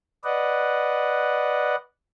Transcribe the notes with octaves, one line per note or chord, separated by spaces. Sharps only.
B4 D5 D#5 F#5